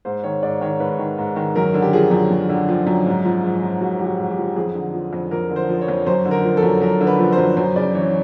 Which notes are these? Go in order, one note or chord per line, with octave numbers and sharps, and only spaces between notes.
G#2 C5
D#3 C#5
G#2 D5
D#3 C#5
G#2 B4
D#3
G#2
D#3
F#2 A#4
D3
G4
F3 G#4
F#2
F#2
D3
F3
F#2
G#2
F3
G#2
F3
G#2 F#4
F3 G4
F#4
G#2
G4
F3
F2 G#4
D3
F3
F2
F2 A#4
D3
C5
F3
C#5
F2
F#2 C5
D3
A#4
F3
A4
F#2
F#2 A#4
D3
B4
F3
C5
F#2
F#2 C5
C#3 D5
E3 C#5